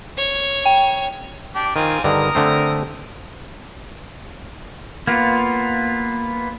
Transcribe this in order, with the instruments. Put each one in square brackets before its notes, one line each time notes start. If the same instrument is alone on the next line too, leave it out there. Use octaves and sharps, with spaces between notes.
[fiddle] C#5
[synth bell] G5
[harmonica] D4 G4
[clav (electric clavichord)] D#3 [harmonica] C4 F4 G#5
[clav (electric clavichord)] G2 D3 D#3 [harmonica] A#4 D#6
[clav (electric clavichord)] D3 A3 C4
[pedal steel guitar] A#3 B3 F4